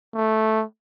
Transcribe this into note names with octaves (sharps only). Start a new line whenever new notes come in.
A3